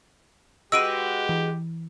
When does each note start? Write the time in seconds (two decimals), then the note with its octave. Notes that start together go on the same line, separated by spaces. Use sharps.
0.72 G#3 F#4 G4 B4 E6 D7 D#7
1.29 E3